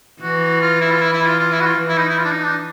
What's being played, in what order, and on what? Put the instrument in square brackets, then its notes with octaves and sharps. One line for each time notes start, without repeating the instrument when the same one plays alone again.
[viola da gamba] E3 [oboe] F#4
[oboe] F4
E4
F4
E4
E4
F4
F4
E4
F#4
F4
[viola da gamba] E3
[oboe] E4
D#4
E4
F4
D4
D#4
D4